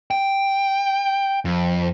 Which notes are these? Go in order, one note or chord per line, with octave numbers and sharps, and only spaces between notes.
G5
F2